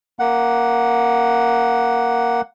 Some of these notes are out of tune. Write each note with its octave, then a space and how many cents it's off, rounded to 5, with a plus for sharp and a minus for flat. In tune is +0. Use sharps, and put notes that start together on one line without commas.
A#3 +0 F#5 +0